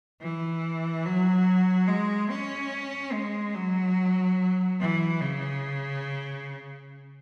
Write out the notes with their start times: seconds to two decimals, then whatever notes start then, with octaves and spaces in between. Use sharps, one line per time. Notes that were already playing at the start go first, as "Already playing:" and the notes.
0.21 E3
1.05 F#3
1.88 G#3
2.30 C#4
3.13 G#3
3.55 F#3
4.80 E3
5.21 C#3